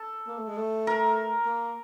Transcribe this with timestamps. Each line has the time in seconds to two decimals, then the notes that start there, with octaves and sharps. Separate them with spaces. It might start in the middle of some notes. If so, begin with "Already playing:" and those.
Already playing: A4
0.28 A#3
0.38 A3
0.48 G#3
0.57 A3
0.87 A#4
1.46 A#3